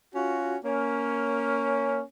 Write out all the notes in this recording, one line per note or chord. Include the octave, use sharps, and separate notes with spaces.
C#4 F4 F#4
A#3 C#4